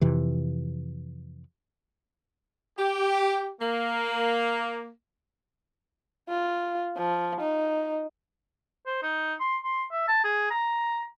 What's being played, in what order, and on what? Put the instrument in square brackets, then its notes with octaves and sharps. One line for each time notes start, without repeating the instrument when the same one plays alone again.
[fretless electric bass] F2 C3 E3
[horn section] G4
A#3
[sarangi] F4
F3
D#4
[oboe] C5
D#4
C6
C6
E5
A5
G#4
A#5